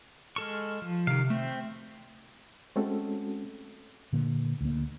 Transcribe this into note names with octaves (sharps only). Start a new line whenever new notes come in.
G#3 A4 C#6 F6
F3
C3 D#3 F5
A3 C4 E5
G#3 A3 C4 C#4 F#4 A4
A#2 D3 A#3
D2 A#3